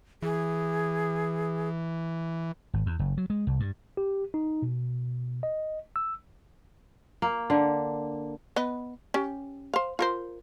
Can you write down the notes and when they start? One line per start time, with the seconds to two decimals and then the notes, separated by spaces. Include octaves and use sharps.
0.22 E3 G#4
2.74 G#1
2.86 E2
2.99 F#1
3.17 F#3
3.30 G#3
3.47 C2
3.60 G2
3.97 G4
4.34 D#4
4.62 B2
5.43 D#5
5.96 E6
7.22 A#3
7.50 D3
8.56 B3 B4 D#5
9.14 C#4 G4
9.74 C5 F5
9.99 F4 A#4 C5